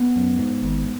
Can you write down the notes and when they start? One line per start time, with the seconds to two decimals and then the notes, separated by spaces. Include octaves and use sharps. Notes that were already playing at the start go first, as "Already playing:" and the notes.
Already playing: B3
0.16 F#2
0.39 G#2
0.63 G#1